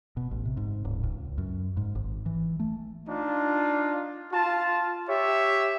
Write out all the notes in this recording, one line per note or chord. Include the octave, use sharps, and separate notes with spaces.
B2
A1
C3
G#2
D1
C#2
F#2
G#2
G#1
E3
A3
D4 D#4 F4
F4 A5
G4 C#5 E5